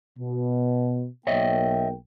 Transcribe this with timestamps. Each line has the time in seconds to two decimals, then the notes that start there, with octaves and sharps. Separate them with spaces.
0.18 B2
1.27 B1 A#3 C#5 D#5 E5 G5